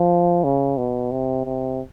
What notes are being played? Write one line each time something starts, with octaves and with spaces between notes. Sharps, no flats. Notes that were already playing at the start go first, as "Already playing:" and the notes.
Already playing: F3
C#3
B2
C3
C3